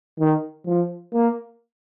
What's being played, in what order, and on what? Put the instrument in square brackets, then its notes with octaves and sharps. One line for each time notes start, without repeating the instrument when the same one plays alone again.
[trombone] D#3
F3
A#3